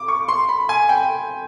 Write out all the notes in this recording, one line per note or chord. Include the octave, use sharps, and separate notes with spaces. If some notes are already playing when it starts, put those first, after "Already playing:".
Already playing: D6
C#6
C6
B5
G#5
G5